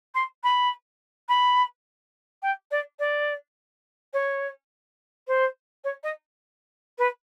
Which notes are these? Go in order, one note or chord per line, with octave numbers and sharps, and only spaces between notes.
C6
B5
B5
G5
D5
D5
C#5
C5
C#5
D#5
B4